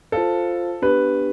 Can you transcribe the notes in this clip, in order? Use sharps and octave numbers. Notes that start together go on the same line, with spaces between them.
F4 A4 C5 F5 A5
B3 D4 G4 B4